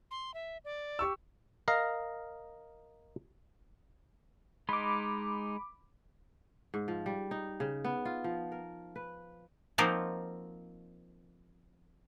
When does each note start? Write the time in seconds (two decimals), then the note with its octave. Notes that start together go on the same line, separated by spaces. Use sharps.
0.11 C6
0.34 E5
0.65 D5
0.99 G4 C#6 E6
1.68 A#4 D#5 F5 A#5
4.69 G#3 D#4 B5 C6 D6
6.74 G#2
6.88 F3
7.06 G3
7.31 D#4
7.60 C#3
7.85 B3
8.05 F4
8.24 F3
8.52 A#4
8.96 B4
9.78 F3 A#3 C4 D#4 F4 F#4